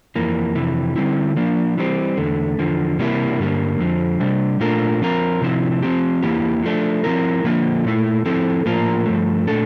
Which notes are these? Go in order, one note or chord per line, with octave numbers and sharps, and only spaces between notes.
F2 E3 A#3
F2 C3 E3
D3 G3 C4 E4
F3 A#3 D4
E3 G3 C4
E2 D3 A3
E2 D3 F3
C3 E3 G3 A#3 E4
G2 D3 G3 A#3
F2 D3 F3
C3 G3 D4
A#2 A3 D4 F4 A#4
F3 C4 F4 A#4
C3 F3 C4 E4
F3 C4 G4
E2 E3 A#3 E4 G4
F3 A3 D4
F3 C4 E4 A#4
D3 F3 A#3 F4
A#2 A3 E4
F3 C4 E4 A4
A2 F3 A#3 F4 A#4
G2 F3 A3
A#2 A3 D4 A4